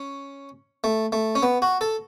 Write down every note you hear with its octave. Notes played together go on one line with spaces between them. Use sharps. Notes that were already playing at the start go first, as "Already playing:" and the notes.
Already playing: C#4
A3
A3
C#4
B3
F#4
A4